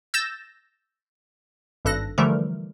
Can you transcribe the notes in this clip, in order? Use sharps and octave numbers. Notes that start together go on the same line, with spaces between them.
E6 G6 A6 A#6 E7
G#1 G2 A4 F#6 A#6
D3 E3 F3 G3 A3 A#4